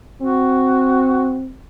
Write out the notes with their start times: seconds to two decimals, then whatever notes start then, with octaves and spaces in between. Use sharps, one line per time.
0.21 C4 F#4